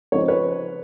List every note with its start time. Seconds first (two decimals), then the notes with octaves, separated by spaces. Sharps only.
0.12 C#3 F3 G#3 C4 D#4 C#5
0.20 C5
0.28 B4 C#5